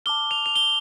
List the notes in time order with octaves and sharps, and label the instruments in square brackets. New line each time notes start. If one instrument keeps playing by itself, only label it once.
[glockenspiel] A5 D6 F6 G7
F7
F7
G7